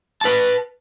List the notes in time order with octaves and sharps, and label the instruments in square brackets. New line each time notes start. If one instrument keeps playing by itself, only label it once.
[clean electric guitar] B4 A5